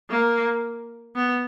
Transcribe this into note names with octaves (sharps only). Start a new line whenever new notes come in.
A#3
B3